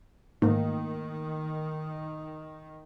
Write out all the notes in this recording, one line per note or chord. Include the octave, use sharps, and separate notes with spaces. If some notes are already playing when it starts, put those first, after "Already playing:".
G#2 D#3 A3 A#3